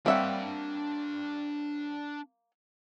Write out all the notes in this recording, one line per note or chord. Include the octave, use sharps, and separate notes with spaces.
G3 A#3 C4 D4 C#5 E5 F#5 G5